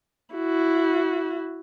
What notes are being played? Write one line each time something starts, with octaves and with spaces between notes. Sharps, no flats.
E4 F#4